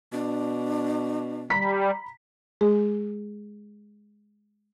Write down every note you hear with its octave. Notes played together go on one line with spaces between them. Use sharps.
B2 D4
G3 A#5 B5 B6
G#3 G#4